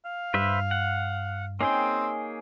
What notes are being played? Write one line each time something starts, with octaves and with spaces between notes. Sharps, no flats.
F5
G2 B4 C5 E5
F#5
A#3 C4 C#4 D#4 G#4 G5